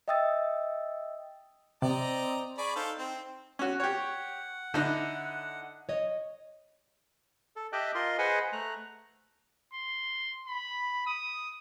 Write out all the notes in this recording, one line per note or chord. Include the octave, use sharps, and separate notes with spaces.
D#5 E5 G5 D#6 E6 A6
C3 C4 D5 D#5 A#5
G#4 D5 B5 C#6
D#4 A4 C5 F5
C4
C#4 F#4
G4 C#5 F#5
D3 D#4 E4 D#5
C#5 D#5
A4
G4 D#5 E5 G5 A5 F#6
F4 A#4 D#5 C6
G#4 B4 C5 D#5 F#5 G#5
A3 A#5 F#6
C6
B5
D#6